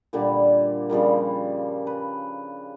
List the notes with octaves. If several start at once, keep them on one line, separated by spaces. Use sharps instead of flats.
A#2 D3 G3 A#3
C#3 F3 G3 A#3
B4